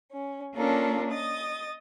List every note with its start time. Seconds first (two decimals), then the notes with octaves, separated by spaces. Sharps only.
0.11 C#4
0.54 A#3 C#4 D4 F4 A4 A#4
1.10 D#5 D#6 A6